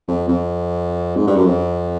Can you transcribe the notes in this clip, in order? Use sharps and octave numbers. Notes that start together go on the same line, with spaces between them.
F2
F2
G#2
G2
F#2
F2